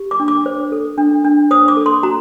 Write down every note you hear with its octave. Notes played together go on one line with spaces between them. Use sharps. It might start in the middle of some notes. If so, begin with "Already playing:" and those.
Already playing: G4
D6
D4
D6
C5
A4
D4
D4
C5 D#6
D6
A4
C6
F#4 A#5